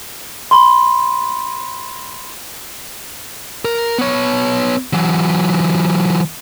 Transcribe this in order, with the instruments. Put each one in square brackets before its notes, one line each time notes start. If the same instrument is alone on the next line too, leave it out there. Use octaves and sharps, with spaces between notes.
[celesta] B5 C6
[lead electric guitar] A#4
B3 C#5
E3 F#3